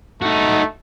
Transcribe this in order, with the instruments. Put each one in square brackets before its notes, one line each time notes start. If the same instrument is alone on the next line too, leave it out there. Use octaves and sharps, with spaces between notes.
[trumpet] A3 [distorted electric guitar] D#4 F#4